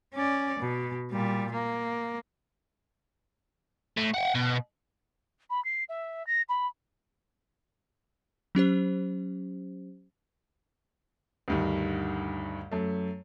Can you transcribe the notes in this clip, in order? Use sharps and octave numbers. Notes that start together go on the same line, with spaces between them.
C#4 D5
B2
A#2 G3
A#3
A2
F#5 G5
B2
B5
C7
E5
A#6
B5
F#3 C#4 G4 C5
D2 G2 D#3
F#2 A3